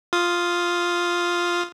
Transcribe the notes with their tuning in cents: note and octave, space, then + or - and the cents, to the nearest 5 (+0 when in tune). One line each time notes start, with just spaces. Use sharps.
F4 +0 F5 +0 D#6 +0